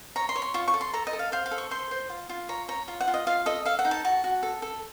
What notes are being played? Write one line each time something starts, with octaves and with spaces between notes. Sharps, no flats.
C#5 A#5
C6
C#5
C6
F4 C#6
C#6
A4
C6
A4 A#5
D#5
A4
F5
C5 F5
F5
A4
C#6
C5 C6
C5
F4
F4
C#5 A#5
C#5 A#5
F4
F#5
F4
D#5
F4 F5
A4 D#5
A4 F5
F#5
D#4
A5
F#4 A5
F#4
A4
A4